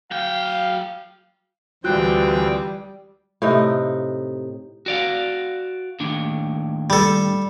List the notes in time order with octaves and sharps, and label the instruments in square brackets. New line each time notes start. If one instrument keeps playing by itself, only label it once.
[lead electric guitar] F#3 G5 [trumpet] F5
[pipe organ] D2 C4 G5 [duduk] E3 [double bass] G3 [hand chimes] F4 F#4 F#6
[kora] A2 C3 D#4
[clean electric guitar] F#4 D5 F5
D#2 A2 D4
[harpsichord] G3 A4